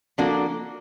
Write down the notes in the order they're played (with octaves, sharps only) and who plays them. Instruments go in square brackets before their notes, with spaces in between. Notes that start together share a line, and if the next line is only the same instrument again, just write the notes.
[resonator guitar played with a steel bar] F3 A#3 D4 F#4 A4